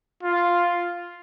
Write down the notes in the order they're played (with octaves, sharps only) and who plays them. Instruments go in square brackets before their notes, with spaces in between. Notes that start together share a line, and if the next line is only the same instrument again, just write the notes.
[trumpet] F4